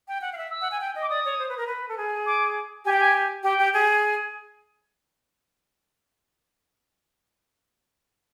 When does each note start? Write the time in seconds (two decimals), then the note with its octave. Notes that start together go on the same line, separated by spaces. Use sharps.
0.08 G5
0.21 F#5
0.33 F5
0.37 E5
0.51 E6
0.61 F#5
0.71 G#5
0.81 G5
0.96 D#5
1.02 D6
1.09 D5 D#6
1.25 C#5
1.39 C5
1.49 B4
1.57 A#4
1.67 B4
1.89 A4
1.97 G#4
2.26 D6
2.85 G4 G#5
2.92 G5
3.00 G#5
3.43 G4 G5
3.59 G4
3.74 G#4